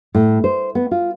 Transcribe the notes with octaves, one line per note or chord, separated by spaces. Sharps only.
A2
C5
B3
F4